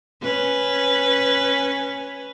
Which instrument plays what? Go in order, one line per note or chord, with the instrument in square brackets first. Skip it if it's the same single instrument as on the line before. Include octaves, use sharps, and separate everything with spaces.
[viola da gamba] C#4 B4